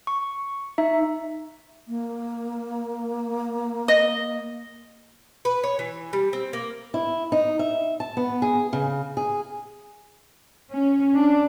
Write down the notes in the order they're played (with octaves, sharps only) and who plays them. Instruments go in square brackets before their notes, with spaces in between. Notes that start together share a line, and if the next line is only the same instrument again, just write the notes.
[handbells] C#6
D#4 E5
[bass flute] A#3
[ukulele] D#5
[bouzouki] B4
C#5
E3
G3
C4
A#3
[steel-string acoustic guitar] E4
D#4
E5
A5
B3
G#4
C#3
G#4
[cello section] C#4
D4